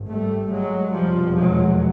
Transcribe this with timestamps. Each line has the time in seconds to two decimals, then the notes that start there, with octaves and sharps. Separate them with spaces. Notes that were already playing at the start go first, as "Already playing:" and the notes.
Already playing: G#1 G2
0.11 G3 A3
0.52 F#3 G#3
0.93 F1 E2 B2 F3 G3
1.36 F#3 G#3